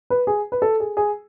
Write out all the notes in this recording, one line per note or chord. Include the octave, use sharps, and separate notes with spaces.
B4
G#4
B4
A4
G#4
G#4